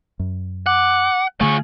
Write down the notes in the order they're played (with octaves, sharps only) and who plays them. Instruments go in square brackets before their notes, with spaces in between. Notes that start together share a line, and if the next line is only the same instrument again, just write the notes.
[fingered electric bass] F#2
[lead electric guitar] F#5 [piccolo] D6
[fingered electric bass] D3 A3 [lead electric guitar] F4 G#4 [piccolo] C#6